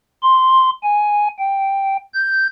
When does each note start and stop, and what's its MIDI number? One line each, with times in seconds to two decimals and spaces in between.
0.22 0.70 84
0.83 1.28 80
1.38 1.96 79
2.13 2.47 91